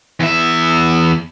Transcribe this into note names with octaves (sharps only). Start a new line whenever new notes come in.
E2 E5